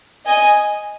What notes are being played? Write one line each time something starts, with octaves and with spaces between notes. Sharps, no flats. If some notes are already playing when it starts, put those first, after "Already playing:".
D#5 G#5